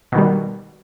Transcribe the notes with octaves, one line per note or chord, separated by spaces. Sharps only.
B2 D#3 G3